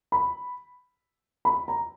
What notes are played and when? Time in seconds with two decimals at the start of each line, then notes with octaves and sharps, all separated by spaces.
0.12 B5
1.45 B5
1.68 A#5